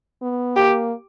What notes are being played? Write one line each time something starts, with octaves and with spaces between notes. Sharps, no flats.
B3
A#3 G4